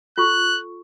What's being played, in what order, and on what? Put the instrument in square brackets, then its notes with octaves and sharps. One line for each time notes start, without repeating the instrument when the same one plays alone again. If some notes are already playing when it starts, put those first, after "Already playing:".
[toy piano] F4 A4 C#6 [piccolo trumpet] F#6